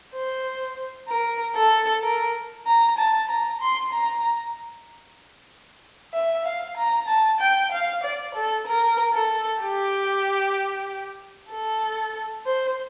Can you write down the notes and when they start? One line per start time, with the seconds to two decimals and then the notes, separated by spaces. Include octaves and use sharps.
0.13 C5
1.08 A#4
1.56 A4
2.02 A#4
2.67 A#5
2.98 A5
3.29 A#5
3.61 C6
3.93 A#5
6.13 E5
6.45 F5
6.77 A#5
7.08 A5
7.40 G5
7.72 F5
8.03 D5
8.35 A4
8.67 A#4
9.14 A4
9.62 G4
11.51 A4
12.46 C5